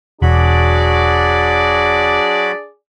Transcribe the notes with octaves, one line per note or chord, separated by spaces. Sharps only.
E1 F#3 D4 F#4 G#4 D5 B5